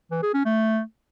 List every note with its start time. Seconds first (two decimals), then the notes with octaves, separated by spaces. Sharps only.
0.11 E3
0.23 G#4
0.34 C#4
0.45 A3